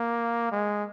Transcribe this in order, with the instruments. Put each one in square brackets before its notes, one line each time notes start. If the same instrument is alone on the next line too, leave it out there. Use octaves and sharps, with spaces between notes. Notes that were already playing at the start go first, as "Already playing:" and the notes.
Already playing: [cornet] A#3
G#3